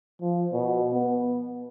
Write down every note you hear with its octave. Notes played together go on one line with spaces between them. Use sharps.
F3
B2
B3